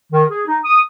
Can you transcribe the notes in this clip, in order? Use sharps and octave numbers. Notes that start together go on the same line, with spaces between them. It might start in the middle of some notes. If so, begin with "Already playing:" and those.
D#3
G#4
D#4
D#6